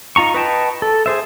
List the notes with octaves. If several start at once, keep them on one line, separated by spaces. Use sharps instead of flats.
D#4 F4 A#5 C#6
B4 D#5 G5 A5
A4
G#4 C5 E5